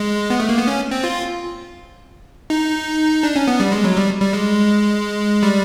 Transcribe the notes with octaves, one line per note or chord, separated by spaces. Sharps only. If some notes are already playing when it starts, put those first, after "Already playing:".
Already playing: G#3
B3
A3
A#3
B3
C#4
C4
F4
D#4
D4
C#4
B3
G3
G#3
F#3
G3
G3
G#3
G3